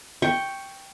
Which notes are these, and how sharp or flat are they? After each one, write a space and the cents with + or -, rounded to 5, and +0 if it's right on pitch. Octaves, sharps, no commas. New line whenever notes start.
G5 +0 C#6 +0